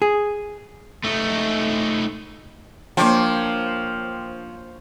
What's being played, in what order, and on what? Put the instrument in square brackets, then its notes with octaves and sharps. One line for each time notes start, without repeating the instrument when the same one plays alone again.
[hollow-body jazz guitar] G#4
[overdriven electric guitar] A3 D#4
[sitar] F3 [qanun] A#3 D4 [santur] C5 C#5 C6 [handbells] G5 D6